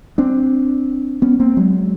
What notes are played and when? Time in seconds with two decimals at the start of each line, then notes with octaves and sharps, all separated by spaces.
0.18 C4 D4
1.22 B3 C#4
1.40 A#3 C4
1.57 F#3 G#3